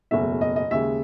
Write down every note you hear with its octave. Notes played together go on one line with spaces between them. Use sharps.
F#1 E2 B2 A3 E5
D#5
D#5
D#2 C#3 G#3 E5